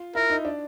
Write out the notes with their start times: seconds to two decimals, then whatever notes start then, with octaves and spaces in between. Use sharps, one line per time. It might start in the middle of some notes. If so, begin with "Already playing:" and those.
Already playing: F4
0.15 E4 A#4
0.30 D#4
0.45 D4